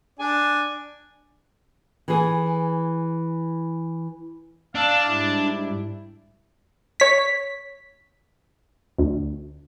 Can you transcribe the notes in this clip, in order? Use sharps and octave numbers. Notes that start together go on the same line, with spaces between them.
D4 D5 G#5
E3 G#4
D4 F5 A5 E6
G#2 G3 E4
C#5 B6
D2